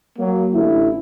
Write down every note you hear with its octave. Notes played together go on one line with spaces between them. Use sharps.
F#3 A#3
A1 D3 E4